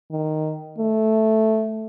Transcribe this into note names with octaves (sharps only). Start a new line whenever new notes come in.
D#3
A3